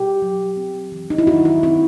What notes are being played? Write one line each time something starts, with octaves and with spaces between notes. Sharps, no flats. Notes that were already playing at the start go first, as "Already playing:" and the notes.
Already playing: B2 G4
F#3
C4
E3
D#4
E4
D#3 F#4
E4
C4 E4